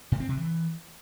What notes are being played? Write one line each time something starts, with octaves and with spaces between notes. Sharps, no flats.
A2
C4
C3
E3